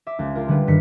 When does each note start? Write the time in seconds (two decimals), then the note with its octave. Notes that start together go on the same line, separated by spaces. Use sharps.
0.07 E5 D6
0.19 C#2
0.35 F4 A#4
0.48 D3 G3 F4 B4
0.67 G2 D#3 B6 C#7